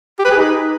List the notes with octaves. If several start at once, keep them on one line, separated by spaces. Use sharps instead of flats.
G4
B4
G#4
D#4